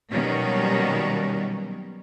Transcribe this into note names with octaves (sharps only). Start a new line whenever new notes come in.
B2 D#3 F#3 G3 A#3 C#4